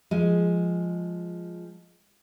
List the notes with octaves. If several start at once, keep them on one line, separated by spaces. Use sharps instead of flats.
F3 G#3